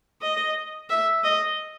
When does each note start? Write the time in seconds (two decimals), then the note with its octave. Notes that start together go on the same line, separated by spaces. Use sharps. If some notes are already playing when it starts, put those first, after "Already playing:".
0.21 D#5
0.90 E5
1.24 D#5